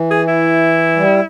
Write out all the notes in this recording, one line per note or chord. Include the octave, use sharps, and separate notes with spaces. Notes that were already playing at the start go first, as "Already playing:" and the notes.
Already playing: E3
G#4
E4
G3